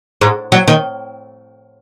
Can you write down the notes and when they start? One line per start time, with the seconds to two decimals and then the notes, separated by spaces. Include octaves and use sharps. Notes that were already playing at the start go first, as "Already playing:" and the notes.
0.21 G#2
0.52 F#3
0.68 D#3